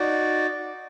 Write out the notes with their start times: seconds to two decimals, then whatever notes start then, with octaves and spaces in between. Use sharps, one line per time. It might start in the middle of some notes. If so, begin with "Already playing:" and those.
Already playing: D#4 F#4 D5